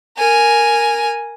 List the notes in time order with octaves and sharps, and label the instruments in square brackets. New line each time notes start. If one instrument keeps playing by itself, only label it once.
[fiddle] A#4 G#5